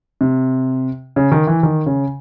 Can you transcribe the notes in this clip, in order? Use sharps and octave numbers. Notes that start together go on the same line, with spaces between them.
C3
C#3
D#3
E3
D#3
C#3